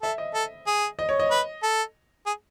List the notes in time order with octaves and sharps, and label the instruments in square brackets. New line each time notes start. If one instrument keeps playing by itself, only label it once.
[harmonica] A4 [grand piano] E5
[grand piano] D#5
[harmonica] A4
G#4
[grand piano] D#5
C#5
D#5
[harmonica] B4
A4
G#4